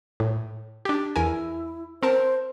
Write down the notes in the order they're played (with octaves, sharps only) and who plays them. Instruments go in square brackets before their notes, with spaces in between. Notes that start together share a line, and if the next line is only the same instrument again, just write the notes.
[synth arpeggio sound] A2
D4 G4
[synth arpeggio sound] E2 A#4 G#5 [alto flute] E4
[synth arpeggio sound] C4 A#4 A5 [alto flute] C5